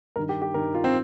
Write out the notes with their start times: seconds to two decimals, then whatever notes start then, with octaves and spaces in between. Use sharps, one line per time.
0.16 G2 D#3 A#4
0.29 G4
0.42 G4
0.54 G2 D#3 A#4
0.74 F4
0.84 C4